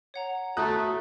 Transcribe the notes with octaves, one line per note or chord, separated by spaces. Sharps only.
C#5 F#5 A#5
A3 F#4 A#5 D#6 F#6 G6 A6